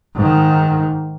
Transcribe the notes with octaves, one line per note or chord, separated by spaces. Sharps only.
G#2 D#3